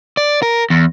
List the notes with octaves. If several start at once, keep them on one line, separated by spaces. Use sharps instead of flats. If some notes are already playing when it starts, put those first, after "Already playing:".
D5
A#4
E2